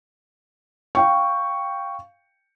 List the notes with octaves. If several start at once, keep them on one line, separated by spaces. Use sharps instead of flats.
F5 G5 C#6